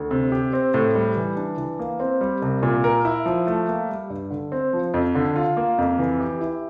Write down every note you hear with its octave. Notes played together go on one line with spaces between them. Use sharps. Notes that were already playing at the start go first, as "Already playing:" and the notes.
Already playing: D2
C3
G4
C4
A2
G3
E3
D4
E3
A#3
C4
G3
C2
A#2
A#4
E4
F3
A3
A#3
G3
G2
D3
C4
F3
F2
D3
F4
A#3
F2
E3
G4
E4